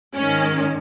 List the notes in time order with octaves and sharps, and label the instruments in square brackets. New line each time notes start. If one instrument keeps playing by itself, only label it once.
[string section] G#2 D#3 C#4